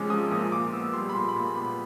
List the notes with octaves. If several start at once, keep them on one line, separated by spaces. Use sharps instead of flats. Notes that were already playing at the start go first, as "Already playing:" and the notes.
Already playing: C3 F3 G#3 C#4 D6
F3 D#6
A#2 D#6
A#2 D6
B3 E6
G3 C6
B5
A#2 C6
B5
A#2
B3 B5